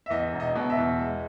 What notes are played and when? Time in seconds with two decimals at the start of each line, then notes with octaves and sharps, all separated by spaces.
0.06 E5
0.10 E2 D#5
0.33 E1
0.40 D#5
0.55 B2
0.70 E5
0.77 E2
0.99 G#3